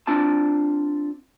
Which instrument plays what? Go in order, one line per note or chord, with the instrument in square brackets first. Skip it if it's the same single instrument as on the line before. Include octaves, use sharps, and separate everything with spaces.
[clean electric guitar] C4 D4 F4 A5